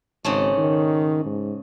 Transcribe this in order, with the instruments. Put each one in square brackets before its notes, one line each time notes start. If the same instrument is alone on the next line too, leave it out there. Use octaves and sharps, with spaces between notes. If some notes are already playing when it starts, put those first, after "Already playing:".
[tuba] G#1 [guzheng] G#2 C#3 A3
[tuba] D#3
G#2